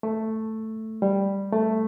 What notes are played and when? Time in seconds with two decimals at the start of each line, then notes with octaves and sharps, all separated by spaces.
0.03 A3
1.02 G3
1.52 A3